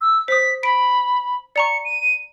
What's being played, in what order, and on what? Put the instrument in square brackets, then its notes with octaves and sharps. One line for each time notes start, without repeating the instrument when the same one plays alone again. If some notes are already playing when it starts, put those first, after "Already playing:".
[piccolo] E6
[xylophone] C5 D#6 [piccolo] B6
[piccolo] B5 [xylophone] B6 D7
[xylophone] D5 A#5 C#6 [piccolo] C#7
[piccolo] D#7